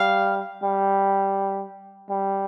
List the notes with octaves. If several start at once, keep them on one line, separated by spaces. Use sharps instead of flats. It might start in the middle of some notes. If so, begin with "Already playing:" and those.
Already playing: G3 F5
G3
G3